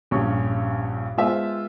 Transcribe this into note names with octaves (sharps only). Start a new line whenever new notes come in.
A#1 G2 C#4 C#6
G#3 B3 F4 C5 E5